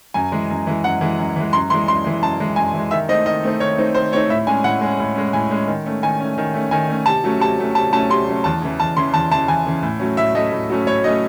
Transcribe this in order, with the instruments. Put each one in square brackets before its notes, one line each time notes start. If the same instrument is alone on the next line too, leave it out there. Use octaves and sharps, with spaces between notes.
[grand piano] F#2 G#5
E3 G#3
F#2
E3 G#3
F#2 F#5
E3 G#3
F#2
E3 G#3
F#2 C6
E3 G#3 C6
F#2 C6
E3 G#3
F#2 A5
E3 G#3
F#2 G#5
E3
G#3
D#3 E5
A3 C4 D#4 D#5
D#3 D#5
A3 C4 D#4
D#3 C#5
A3 C4 D#4
D#3 C5
A3 C4 D#4 C#5
A2 E5
G#3 C#4 G#5
A2 F#5
G#3 C#4
A2
G#3 C#4
A2 G#5
G#3 C#4
D#3
A3 C#4
D#3 G#5
A3 C#4
D#3
A3 C#4
D#3 G#5
A3 C#4
C3 A5
F#3 A3 C#4
C3 A5
F#3 A3 C#4
C3 A5
F#3 A3 C#4 A5
C3 C6
F#3 A3 C#4
E2 A5
C#3 E3
E2 A5
C#3 E3 C6
E2 A5
C#3 E3 A5
E2 G#5
C#3 E3
A2
F#3 A3 C#4
A2 E5
F#3 A3 C#4 D#5
A2
F#3 A3 C#4
A2 C#5
F#3 A3 C#4 D#5